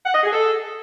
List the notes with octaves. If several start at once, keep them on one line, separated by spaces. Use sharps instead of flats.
F#5
D#5
G#4
A4